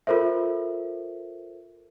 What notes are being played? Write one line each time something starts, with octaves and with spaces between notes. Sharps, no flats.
F4 A4 A#4 C5 E5